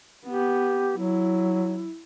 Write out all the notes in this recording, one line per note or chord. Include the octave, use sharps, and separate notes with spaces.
B3 G4
F#3 E4